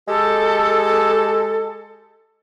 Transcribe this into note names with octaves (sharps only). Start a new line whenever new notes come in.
G#3 G4 A4